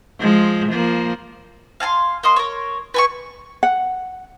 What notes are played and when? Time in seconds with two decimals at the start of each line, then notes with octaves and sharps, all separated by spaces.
0.20 F3 G#3
0.69 F3 A#3
1.80 F5 G#5 A5 C6
2.23 A#3 D#5 C6
2.36 A#4 C#5
2.94 B4 G#5 C#6
3.63 F#5